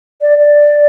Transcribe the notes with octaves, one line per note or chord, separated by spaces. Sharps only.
D5
D5